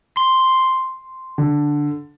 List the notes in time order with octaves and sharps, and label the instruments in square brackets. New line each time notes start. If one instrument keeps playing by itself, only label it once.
[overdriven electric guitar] C6
[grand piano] D3